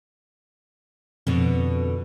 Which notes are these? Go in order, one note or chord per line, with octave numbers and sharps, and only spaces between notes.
F2 B2 D3